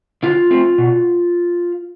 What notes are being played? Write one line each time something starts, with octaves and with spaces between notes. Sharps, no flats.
D3 F4
A3 C4
B2